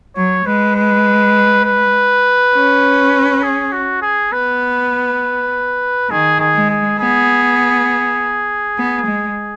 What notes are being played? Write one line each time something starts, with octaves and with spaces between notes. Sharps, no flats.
F#3 C#5
G#3 B4
B4
B4
C#4
G#4
F#4
G#4
B3 B4
D#3 G#4
G#4
G#3
G#4
B3 G#4
B3
G#3